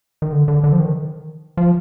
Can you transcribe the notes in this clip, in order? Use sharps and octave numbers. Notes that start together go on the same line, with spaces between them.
D#3
D3
D3
D3
F3
D#3
F3